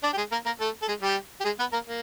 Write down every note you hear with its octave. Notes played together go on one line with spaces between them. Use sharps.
D4 D5
G4
G#3 G#4
A#3 A#4
A#3 A#4
A3 A4
A4
G#3 G#4
G3 G4
G4
G#3 G#4
B3 B4
A#3 A#4
A#3